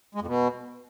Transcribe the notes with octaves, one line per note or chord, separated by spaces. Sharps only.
G#3
F2
B2